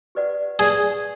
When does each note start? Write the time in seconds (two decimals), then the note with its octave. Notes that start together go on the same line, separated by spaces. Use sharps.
0.15 G4 B4 D5 F#5
0.59 G4 G#4 B4 D5 F#5